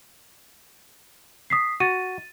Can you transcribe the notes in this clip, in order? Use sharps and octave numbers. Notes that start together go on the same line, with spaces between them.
D#6 B6 C7
F#4 A6 D#7